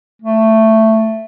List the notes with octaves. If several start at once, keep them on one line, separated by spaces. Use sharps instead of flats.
A3